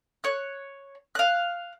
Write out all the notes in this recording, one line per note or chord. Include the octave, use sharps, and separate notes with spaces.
C#5 F#6
F5 F#6